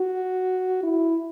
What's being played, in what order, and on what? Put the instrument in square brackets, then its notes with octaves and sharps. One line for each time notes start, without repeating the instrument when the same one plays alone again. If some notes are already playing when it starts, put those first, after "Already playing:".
Already playing: [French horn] F#4
E4